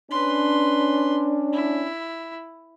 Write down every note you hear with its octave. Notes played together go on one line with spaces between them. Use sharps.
C#4 D4 B4 C6
E4